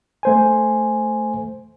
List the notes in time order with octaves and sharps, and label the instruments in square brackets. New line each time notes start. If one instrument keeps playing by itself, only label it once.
[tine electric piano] A3 C5 G#5